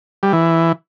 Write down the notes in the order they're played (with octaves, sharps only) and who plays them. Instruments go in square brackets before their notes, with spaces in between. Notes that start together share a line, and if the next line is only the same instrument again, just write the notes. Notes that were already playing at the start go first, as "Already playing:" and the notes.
[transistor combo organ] G3
E3